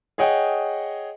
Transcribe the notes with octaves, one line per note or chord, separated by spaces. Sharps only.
G#4 C#5 D#5 F#5 G5